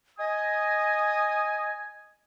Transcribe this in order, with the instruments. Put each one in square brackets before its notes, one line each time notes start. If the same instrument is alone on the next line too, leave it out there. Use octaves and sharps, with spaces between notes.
[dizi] D#5 [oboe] G#5 [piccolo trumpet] D#6